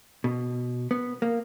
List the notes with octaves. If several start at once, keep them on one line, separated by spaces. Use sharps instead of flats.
B2
B3
A#3